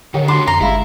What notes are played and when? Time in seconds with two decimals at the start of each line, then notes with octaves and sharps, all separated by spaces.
0.14 D3 D#3 G4 C#5 F#5
0.28 D4 F#4 B5 C6 D6
0.48 F2 A#5 C6
0.61 G1 G#3 E4 F5 B5